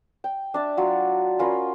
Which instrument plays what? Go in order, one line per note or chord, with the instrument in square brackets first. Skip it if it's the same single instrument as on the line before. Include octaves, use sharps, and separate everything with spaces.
[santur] G5
D4 D5 E5
F#3 F4
C#4 F4 A#4 B5